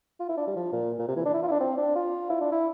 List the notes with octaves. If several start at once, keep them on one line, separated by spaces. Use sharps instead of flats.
F4
E4
D4
G3
F3
A#2
A#2
C3
E3
D4
E4
F4
E4
D4
C4
D4
F4
E4
D4
E4